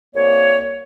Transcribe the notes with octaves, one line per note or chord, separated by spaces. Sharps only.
C2 A#3 C#5